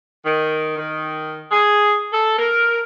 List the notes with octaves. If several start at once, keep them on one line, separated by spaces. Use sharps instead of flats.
D#3
D#3
G#4
A4
A#4